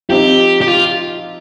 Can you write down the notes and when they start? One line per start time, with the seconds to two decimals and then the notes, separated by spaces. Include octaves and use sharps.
0.09 F3 C4 D#4 G4
0.61 G4
0.68 F4